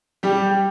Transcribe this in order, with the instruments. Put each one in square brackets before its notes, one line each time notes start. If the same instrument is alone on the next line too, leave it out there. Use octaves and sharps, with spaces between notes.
[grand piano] G3 G4